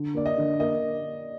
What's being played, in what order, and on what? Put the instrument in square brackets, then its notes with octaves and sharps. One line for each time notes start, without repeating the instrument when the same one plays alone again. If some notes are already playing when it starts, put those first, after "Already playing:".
Already playing: [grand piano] D3
[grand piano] A#3 [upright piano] D5
[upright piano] D#5
[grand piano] D3
[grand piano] A#3 [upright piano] D#5